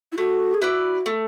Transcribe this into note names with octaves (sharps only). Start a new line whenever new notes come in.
E4
A3 F#4
G#4
E4 F#4 B4 D5
A3